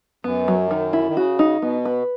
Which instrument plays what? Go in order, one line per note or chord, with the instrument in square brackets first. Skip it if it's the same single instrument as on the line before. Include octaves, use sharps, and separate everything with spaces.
[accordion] F#2 [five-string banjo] B3
[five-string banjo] F#3
D#3
E4
[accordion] D#3
[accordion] C#3 [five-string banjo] F#4
[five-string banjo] D#4
[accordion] B2 [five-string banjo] B3
[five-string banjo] B4